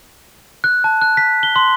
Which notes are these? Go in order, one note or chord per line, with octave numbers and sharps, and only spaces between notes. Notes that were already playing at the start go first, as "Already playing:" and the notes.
F#6
A5
F#6
B6
G7
C6